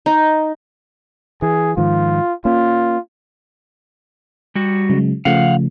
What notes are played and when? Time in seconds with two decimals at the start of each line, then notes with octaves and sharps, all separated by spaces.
0.06 D#4
1.42 E3 G#4
1.77 G#2 D#3 F3 F4
2.45 A#3 C#4 F4
4.55 G3 F#4
4.90 C#3 F#3 G#3
5.25 C#3 F3 A3 F5 F#5